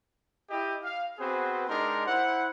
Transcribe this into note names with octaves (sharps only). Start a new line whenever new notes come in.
E4 G4 D#5
F5
B3 C4 F#4 G#4 B4 C5
G#3 D4 D#4 G4 A#4 C6
E4 C5 F#5